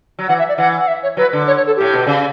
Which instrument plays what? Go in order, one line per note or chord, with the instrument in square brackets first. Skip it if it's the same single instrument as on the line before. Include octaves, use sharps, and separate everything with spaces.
[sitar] F#3
[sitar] E3 [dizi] F#5
[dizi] E5
D5
[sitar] E3 [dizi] F#5
[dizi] F#5
E5
C#5
[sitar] F#3 [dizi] B4
[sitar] D3
[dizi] C#5
C#5
A4
[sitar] A2 [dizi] G4
[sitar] B2
C#3